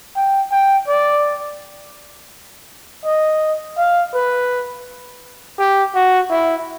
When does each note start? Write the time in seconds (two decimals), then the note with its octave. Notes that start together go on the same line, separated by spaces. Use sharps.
0.16 G5
0.52 G5
0.88 D5
3.05 D#5
3.77 F5
4.14 B4
5.58 G4
5.95 F#4
6.30 E4